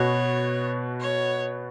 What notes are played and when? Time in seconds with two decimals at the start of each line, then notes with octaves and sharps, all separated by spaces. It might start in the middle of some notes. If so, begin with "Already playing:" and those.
Already playing: B2 B3 F#4 C#5
1.00 C#5